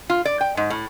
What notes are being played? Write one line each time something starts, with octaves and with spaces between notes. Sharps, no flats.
F4
D5
G5
G#2
A2